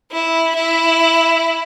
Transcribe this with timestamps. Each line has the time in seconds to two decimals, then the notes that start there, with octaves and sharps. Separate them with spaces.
0.12 E4
0.55 E4